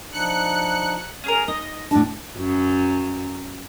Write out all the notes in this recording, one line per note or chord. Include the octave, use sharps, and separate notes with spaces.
F3 D4 D#4 F#6 C#7
C#4 G#4 A#4
D#4 D#5
A2 D4 A5
F#2